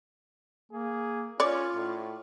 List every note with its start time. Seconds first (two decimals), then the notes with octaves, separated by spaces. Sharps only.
0.72 A#3 G#4
1.40 C#4 F4 C#5 D5
1.75 A2